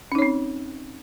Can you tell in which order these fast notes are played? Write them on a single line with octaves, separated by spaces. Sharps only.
C#4 D#4 C#5 C4